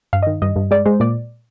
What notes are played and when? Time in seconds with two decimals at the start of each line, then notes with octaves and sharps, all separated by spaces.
0.13 G2 F5
0.23 D#5
0.26 D#3
0.42 G2 D#5
0.56 G2
0.71 G#3 D5
0.86 G#3 C5
1.00 A#2 D5